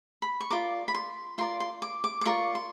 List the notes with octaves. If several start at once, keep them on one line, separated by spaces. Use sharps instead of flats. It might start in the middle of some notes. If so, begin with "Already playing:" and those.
B5
C#6
F4 A#4 D5 D6
B5
C6
F4 A#4 D5 C6
C6
D6
D6
D6
F4 A#4 D5 C#6
C6